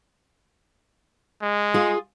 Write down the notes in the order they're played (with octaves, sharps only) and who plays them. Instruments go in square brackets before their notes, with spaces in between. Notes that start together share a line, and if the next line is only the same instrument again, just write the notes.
[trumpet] G#3
[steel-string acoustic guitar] F4 G#4